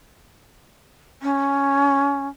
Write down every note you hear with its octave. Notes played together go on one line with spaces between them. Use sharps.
C#4